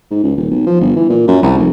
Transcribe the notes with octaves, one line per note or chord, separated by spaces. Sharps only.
G#2
C#2
D#1
B1
F3
G1
E3
A#2
F#2
C2
F1